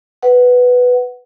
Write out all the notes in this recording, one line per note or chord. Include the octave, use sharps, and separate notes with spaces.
B4 F#5